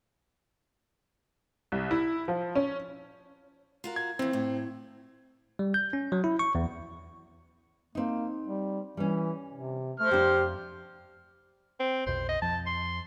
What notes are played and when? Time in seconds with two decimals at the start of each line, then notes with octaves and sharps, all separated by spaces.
1.72 C2
1.91 E4
2.28 F3
2.55 C#4
3.84 F4 F#4 A#4
3.96 G#6
4.19 D#2 E3 C4
4.33 A2
5.59 G3
5.74 G6
5.93 C#4
6.12 F#3
6.24 E4
6.39 C#6
6.55 E2
7.95 A#3 C4 D#4
8.47 G3
8.97 E3 G3 C#4
9.53 C3
10.00 A3 C5 F6
10.11 F2 D4 G4
11.80 C4
12.07 B1 F2 B2 C5
12.29 D#5
12.42 F2 F3 A5
12.67 C6